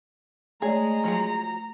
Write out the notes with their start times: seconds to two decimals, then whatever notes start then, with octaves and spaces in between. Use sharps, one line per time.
0.62 G#3 A3 G#4 C#5 D5 A#5
1.04 F3 F#3 G#4